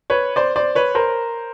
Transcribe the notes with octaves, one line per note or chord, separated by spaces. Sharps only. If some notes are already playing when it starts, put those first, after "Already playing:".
B4 C#5
C5 D5
C5 D5
B4 C#5
A#4 C5